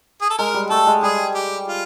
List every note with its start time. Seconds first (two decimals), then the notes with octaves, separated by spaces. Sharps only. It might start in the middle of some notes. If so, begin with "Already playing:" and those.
0.21 G#4
0.30 A4
0.38 G#3 A#4
0.54 G3
0.70 A3 A4
0.87 G#3
1.03 G3 G#4
1.35 G4
1.68 F4